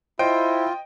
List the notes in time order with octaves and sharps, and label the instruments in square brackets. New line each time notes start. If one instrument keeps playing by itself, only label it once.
[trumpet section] E4 [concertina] F4 [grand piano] C5 [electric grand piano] D#5 G5 D7